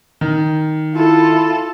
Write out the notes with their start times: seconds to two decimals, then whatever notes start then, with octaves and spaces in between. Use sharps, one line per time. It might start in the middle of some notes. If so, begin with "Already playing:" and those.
0.21 D#3
0.94 E4 F4 A4